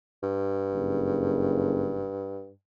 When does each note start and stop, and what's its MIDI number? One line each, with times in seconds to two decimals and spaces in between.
0.23 2.51 43
0.74 2.08 30